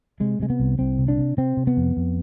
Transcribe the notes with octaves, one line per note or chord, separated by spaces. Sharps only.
C3 G#3
C3 G#3
B3
C2
C2 C4
C3
D4
C3
C3 C4
C3
B3
F2
F2